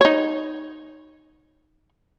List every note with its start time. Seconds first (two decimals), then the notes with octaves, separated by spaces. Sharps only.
0.01 D#4 C#5